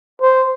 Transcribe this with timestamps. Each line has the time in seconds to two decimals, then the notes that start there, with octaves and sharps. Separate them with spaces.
0.22 C5